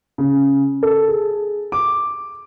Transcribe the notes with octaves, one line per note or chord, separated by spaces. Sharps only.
C#3
A4
G#4
D6